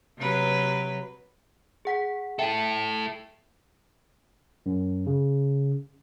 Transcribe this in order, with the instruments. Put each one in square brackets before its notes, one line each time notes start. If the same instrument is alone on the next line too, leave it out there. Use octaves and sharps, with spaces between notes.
[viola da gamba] C3 F#3 B4
[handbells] G#4 F#5 B6
[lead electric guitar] E4 A4 [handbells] E5 G5
[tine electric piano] F#2
C#3